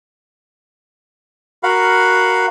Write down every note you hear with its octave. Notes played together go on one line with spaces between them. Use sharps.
F#4 A#4 F5 F#5 B5